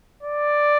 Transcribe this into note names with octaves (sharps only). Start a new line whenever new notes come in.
D5